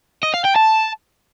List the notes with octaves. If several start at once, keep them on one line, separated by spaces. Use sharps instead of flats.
D#5
F5
G5
A5